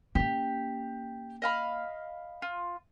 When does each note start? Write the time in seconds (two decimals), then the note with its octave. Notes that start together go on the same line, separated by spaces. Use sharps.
0.15 A#3 C#4 G4
1.42 D#5 F5 B5
2.42 F4